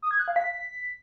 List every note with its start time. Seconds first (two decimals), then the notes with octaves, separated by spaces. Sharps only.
0.02 D#6
0.11 G#6
0.19 F#6
0.28 F5
0.36 B6